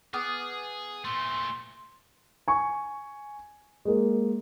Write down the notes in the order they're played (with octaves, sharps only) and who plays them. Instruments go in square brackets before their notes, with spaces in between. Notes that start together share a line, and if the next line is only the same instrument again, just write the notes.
[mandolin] B3 D6 F6 [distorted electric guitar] G#4
[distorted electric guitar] A#2 A3 [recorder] C6
[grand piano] G#5 C#6
G#3 A#3